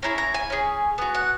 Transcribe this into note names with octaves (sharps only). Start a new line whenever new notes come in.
C#4 E4 G#4 A#5
A#5
G#5
C#4 E4 G#4
B3 F#4
F#5